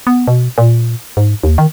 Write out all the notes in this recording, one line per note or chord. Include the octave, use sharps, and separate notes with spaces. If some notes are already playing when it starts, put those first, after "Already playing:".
B3
B2
A#2
G#2
D#2
D#3